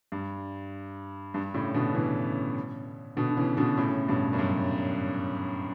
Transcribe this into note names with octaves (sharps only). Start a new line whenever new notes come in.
G2
G2
A2 C#3
B2 D3
C#3 E3
B2 D3
D3
C#3 E3
B2 D3
A2 C#3
G2 B2
F#2
G2